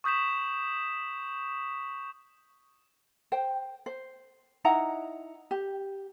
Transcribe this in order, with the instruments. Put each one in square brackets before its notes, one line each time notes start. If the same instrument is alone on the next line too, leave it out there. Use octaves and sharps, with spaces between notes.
[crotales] C#6 D#6 G6 B6 E7
[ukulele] C5 G5
C5
D#4 E4 F#5 A#5
G4